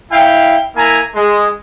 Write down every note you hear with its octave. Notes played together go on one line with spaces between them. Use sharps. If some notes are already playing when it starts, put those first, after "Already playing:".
E4 F5 G5
A#3 E4 G#5 A#5
G#3